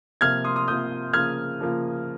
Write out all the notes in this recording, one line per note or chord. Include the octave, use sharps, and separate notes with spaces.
C3 F3 A#3 F4 F6 G#6
C6 D#6
C6 D#6
C3 F3 A#3 F4 D#6 G6
C#3 F3 A#3 F4 F6 G#6
C#3 F3 A#3 F4